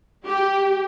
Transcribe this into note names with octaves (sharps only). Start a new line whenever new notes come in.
G4